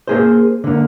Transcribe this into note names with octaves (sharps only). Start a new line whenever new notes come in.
A#3 G#4 C5
D3 A#3